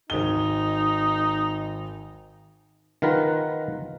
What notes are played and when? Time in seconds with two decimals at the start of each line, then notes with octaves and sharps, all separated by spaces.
0.10 G#1 D#4 G7
3.02 D#3 F4 A#4 B4 F#5